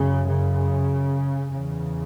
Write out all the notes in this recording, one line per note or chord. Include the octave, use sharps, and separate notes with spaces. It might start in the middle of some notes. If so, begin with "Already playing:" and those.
Already playing: F#2 C#3
C#3
E2 C#3